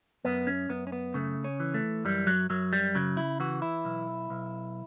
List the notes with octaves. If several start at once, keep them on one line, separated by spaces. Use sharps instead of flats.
F#2 B3
C#4
F#2 B3
C#4
B3
C#3 A3
C#4
E3
A3
F#2 G3
F#3
F#2 F#3
G3
C#3 F#3
E4
E3 F#4
E4
B1
B1